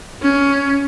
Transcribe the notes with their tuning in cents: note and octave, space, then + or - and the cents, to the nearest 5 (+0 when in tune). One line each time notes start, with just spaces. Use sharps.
C#4 +15